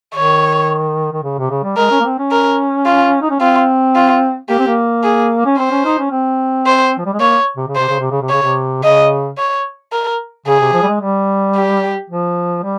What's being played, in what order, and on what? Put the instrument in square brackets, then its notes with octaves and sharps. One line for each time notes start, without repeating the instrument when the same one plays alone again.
[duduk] D#3 [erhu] C#5
[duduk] D#3
C#3
C3
C#3
G3
[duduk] G#3 [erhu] A#4
[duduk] C#4
A#3
C4
C#4
[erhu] A#4
F4
[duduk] D#4
C#4
[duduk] C4 [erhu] F4
[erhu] F4
[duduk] A#3 [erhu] G4
[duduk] C4
A#3
[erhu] G#4
[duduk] C#4
[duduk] C4 [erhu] C5
[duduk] C#4
D#4
C#4
C4
[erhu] C5
[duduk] F3
G3
G#3
[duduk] A#3 [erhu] C#5
[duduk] C3
C#3
[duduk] C3 [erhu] C5
[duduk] C#3
C3
C#3
C3
[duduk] C#3 [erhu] C#5
[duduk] C3
[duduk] C#3 [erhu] D#5
[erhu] C#5
A#4
[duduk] C#3 [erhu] G#4
[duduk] C3
F3
G3
G#3
G3
[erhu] G4
[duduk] F3
G3